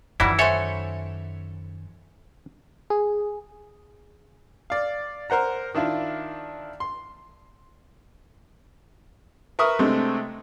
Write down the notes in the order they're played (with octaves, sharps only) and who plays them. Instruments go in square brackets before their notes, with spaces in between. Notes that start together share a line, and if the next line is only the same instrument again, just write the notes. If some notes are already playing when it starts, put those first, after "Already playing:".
[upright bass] F#2 D#3 [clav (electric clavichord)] E3 E4 [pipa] F#3 G3
[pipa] F#4 C5 [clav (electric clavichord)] A4 C#5 [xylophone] E5 G#5
[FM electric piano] G#4
[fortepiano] D5 F5
A#4 C5 F#5 A#5
D#3 D4 E4 F4 D5
C6
A#4 B4 E5 C#6 D#6
C3 G#3 A3 C4 D4